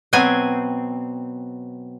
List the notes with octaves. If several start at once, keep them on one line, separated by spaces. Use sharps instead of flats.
B2 F#3 C4 G#5